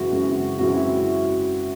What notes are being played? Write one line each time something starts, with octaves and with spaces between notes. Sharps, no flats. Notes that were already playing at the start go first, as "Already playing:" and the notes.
Already playing: F#2 C#3 E3 G#3 C4 F#4
F#2 C#3 E3 G#3 C4
F#2 C#3 E3 G#3 C4 F#4
E4